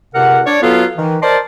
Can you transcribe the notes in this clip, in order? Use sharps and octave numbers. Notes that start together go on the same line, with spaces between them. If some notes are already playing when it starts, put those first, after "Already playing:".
C#2 C3 A#4 F#5
D4 C#5 D5
F#3 B3 F4 A4 B4 F5
D#3 E3
A#4 C5 D5 D#5 A5 C6